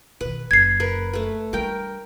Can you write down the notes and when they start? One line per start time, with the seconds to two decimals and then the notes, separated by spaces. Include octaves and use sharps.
0.21 B2 D#3 B4
0.51 F#1 G#6 C7
0.80 A#4 B4
1.13 A3 B4
1.53 G3 D4 A#4 G5